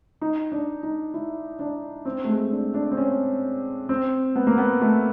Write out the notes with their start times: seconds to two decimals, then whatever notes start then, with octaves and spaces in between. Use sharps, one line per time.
0.21 D#4
0.52 D4
0.83 D#4
1.14 E4
1.59 D4
2.05 C4
2.24 A3
2.29 G#3
2.51 D4
2.74 D4
2.91 C4
2.97 C#4
3.89 C4
4.36 B3
4.47 A#3
4.58 B3
4.82 A3